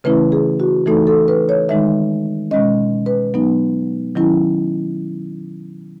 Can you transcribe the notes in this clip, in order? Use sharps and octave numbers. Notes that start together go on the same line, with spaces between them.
C#3 E3 A3 C#4 E4 B4
G#4
F#4
E3 A3 D#4 A4
A4
B4
C#5
D#3 G#3 D#4 E5
B2 G#3 C#4 D#5
B4
F#3 B3 D#4
D#3 F#3 C#4 E4